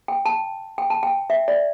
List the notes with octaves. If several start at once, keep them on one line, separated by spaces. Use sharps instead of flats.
G5
A5
G5
A5
G5
E5
D5